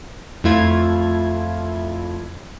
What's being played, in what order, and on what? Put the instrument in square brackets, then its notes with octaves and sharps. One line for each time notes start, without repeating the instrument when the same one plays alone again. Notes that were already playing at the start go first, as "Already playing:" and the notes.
[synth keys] F2 A3 E4 F4 G#6